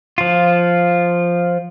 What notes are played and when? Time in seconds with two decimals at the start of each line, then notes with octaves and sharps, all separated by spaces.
0.18 F3 F4